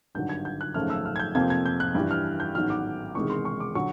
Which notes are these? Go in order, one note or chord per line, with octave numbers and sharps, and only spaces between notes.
G#1 G2 D3 F#3 G6
G#6
G6
F#6
G#1 F#2 C#3 F3 A3 F6
E6
F6
G#6
G6
F2 C3 F3 A#3 G#6
G#6
G6
F#6
G2 E3 G3
F6
G6
A1 G#2 D#3 F#3 B3 F6
D6
E1 E2 C3 D#3 G#3 C#6
C6
C#6
D6
D3 F#3 C#6